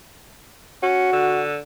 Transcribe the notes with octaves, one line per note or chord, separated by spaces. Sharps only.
C#4 F#4
D3